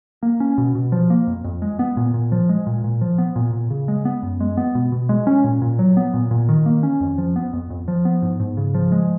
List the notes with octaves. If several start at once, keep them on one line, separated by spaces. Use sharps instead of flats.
A#3
C#4
B2
B2
F3
A#3
F2
F2
G#3
B3
A#2
A#2
F3
G#3
A#2
A#2
F3
B3
A#2
A#2
C#3
G#3
B3
F#2
G#3
B3
B2
B2
G#3
C#4
A#2
A#2
F#3
B3
A#2
A#2
D#3
A#3
C#4
F2
F3
B3
F2
F2
F3
B3
G#2
G#2
C#3
F3
G#3